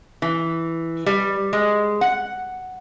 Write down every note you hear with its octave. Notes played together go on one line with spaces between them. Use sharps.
E3
G3
G#3
F#5